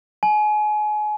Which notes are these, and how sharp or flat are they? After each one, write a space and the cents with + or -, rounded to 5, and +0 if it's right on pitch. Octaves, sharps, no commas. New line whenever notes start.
G#5 +30